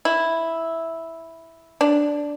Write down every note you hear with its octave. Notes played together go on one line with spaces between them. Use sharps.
E4
D4